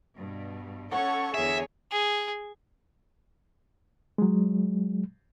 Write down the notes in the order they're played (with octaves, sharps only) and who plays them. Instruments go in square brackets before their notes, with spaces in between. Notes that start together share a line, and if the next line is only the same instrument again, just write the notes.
[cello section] G2 B2
[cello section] C#4 A4 C#5 [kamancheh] F#5 C#6
[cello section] E2 D3 [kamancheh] G#4 C#5 [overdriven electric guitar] E5
[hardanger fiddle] G#4
[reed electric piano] F#3 G#3